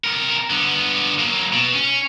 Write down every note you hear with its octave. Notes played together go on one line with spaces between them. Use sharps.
C3 A#4
D3 B3
F#3 A#3
B2
C#4